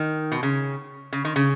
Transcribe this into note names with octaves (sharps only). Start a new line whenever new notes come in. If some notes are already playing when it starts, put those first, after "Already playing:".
Already playing: D#3
B2
C#3
C#3
D#3
C#3